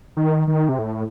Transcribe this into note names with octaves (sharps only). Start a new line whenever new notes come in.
D#3
D#3
C3
A2